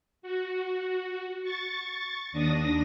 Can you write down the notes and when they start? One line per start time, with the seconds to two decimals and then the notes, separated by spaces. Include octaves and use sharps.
0.22 F#4
1.42 C#6 A6
2.32 D#2 D4 D#6 A#6